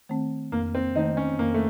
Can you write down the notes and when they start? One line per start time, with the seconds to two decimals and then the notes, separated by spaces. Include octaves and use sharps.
0.09 D#3 A3 C4
0.52 F2 A#3
0.75 C4
0.96 D#3 A3 C4 D#4
1.17 C#4
1.39 F2 A#3
1.54 A3